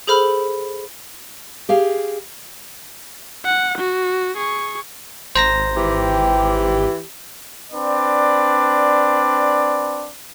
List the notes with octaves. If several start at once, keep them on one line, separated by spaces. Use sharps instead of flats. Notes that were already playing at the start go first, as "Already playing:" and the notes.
G#4 A4 C5 B5 F6
G4 G#4 F5
F#5
F#4
G#4 C#6
G#1 C5 A#5 A#6
E3 G4
C4 D4 B4 D5